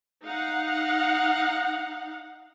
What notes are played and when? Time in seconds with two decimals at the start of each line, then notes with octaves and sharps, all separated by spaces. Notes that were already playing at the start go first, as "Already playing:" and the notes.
0.25 D#4 F5 F#5